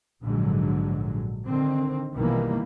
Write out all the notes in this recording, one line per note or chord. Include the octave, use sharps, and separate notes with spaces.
A#1 G#2 D3 F#3
D3 D#3 C4
A#1 B2 D#3 E3 G3 A#3